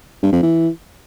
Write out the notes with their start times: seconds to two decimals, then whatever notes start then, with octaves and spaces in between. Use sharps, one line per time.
0.23 G2
0.33 F2
0.42 E3